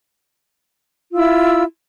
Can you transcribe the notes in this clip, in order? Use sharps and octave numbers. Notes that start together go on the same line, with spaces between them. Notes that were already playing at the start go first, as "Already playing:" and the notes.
E4 F4 E6